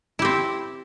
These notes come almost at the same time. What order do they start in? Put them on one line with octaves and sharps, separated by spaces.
E4 G4 C4